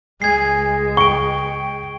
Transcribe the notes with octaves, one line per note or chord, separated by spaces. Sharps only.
C#2 G#3 G#5 G#6 C7
G5 C#6 D7 G7